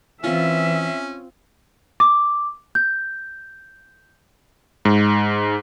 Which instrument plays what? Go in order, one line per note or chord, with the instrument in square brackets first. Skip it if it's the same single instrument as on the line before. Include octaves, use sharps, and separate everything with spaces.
[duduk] E3 [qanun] C4 F4 [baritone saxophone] C#4 [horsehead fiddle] E5
[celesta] D6
G6
[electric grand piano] G#2